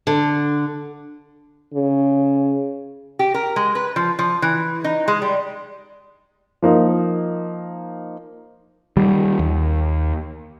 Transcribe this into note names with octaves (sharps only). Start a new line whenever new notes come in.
D3
C#3
G4
A#4
G#3
B4
F3
F3
E3
D#4
G#3
G3
F3 A#3 D#4
D#3 G3
D#2